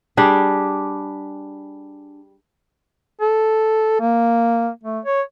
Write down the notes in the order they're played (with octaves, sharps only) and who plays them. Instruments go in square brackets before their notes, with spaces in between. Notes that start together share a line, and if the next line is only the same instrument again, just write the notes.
[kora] G3 D4 G4 G#4
[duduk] A4
A#3
A3
C#5